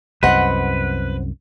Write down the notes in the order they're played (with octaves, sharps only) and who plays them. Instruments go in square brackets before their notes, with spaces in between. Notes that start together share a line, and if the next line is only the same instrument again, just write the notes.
[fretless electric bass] C2 F#2 [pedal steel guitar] B4 [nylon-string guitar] C5 D#5 F#5